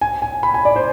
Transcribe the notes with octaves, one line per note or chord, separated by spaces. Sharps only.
G#5
G#5
B5
G#5
D5
C5